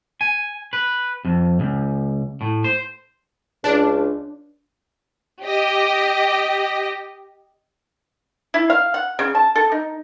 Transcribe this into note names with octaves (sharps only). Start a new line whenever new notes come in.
G#5
B4
F2
C#2
A2
C5
C#2 D4
G4 D#5
E4
F5
F#5
C#3
A5
A4
D#4